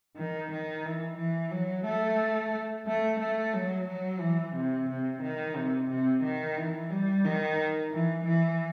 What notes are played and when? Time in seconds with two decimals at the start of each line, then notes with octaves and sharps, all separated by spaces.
0.17 D#3
0.52 D#3
0.85 E3
1.18 E3
1.51 F#3
1.85 A3
2.87 A3
3.20 A3
3.54 F#3
3.88 F#3
4.21 E3
4.55 C3
4.89 C3
5.22 D#3
5.57 C3
5.90 C3
6.23 D#3
6.58 E3
6.90 G3
7.25 D#3
7.92 E3
8.25 E3